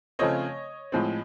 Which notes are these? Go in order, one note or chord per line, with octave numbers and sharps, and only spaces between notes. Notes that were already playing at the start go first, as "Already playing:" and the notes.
C#3 F3 A3 C4 C#5 D#5
A2 F3 G#3 C4